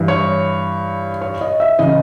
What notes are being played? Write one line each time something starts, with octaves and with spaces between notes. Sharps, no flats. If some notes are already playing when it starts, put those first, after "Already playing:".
Already playing: G2 E3
C#5
C#5
D#5
E5
C#3 E3 D#5